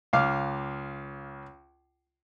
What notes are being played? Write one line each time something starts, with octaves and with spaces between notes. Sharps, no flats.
C#2 F5 D6 F6